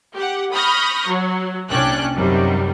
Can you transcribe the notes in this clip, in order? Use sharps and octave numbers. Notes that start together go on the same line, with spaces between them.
G4 F#5
B5 C#6 D#6 F6 G6 A#6
F#3
C2 A#2 C#4 D4 G5 F#6
F#2 C3 D#3 F#3 G3